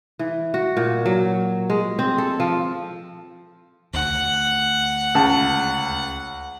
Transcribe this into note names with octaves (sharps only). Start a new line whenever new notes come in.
E3
F#4
A#2
F#3
G#3
C4
A4
F3
D2 F#5
C#2 A5